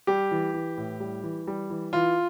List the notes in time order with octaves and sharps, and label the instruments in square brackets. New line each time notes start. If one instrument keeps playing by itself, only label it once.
[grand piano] G3 G4
E3
E3
A2
G3
E3
G3
E3
E3 F4